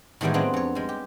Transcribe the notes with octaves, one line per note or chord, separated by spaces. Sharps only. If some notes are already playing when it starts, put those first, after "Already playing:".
A2 D#3 E3 G3 G#3 B3
F#3 B3 C4 D4 F4 G#4
F2 C#5
G3 G#3
G4